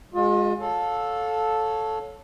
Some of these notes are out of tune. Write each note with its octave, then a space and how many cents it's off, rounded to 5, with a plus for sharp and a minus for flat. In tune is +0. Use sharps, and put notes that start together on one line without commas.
G#3 -10 F4 +40 D#5 +30
A4 -5 C#5 +0 F5 +30